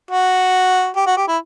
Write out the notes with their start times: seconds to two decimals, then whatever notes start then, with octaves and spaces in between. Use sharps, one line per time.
0.11 F#4
0.96 G4
1.07 F#4
1.17 G4
1.28 E4